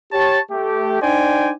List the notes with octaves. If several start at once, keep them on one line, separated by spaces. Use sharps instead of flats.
G4 C#5 A5
A3 G4
D4 D#4 C5 D5 G5 G#5